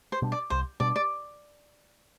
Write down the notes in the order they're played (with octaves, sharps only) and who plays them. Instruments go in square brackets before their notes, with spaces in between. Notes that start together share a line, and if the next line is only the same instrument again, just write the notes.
[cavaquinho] C5
[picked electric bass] B2 G3 D4
[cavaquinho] D5
[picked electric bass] C2 [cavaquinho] C5
[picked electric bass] B2 G3 D4 [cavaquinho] D5
[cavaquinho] D5